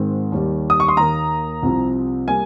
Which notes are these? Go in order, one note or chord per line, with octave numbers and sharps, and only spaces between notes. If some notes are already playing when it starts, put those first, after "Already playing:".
Already playing: G#2 D#3 G#3 C4
D#2 D#3 G3
D#6
C#6
C6
D#2 D#3 A#3 A#5
C2 C3 F3 C4
G3 A#3 G#5